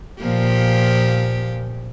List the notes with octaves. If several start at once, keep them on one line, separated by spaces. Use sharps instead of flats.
A#2 F3 G4